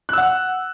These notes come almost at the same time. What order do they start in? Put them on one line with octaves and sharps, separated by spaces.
F#6 E6 F#5